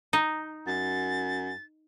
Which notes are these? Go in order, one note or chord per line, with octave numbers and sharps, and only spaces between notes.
D#4
F#2 A6